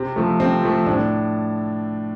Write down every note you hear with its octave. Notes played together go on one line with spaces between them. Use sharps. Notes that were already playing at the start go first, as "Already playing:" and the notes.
Already playing: C3 C4
F3 A3
C3 C4
F3 A3
A2 D4